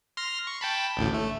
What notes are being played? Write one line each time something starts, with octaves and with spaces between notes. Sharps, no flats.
C6 F6 A#6
C#6
G5 A5 B5
A1 D2 A2
A3